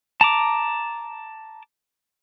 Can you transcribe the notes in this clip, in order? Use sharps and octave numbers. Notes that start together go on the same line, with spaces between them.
A5 A#5 D6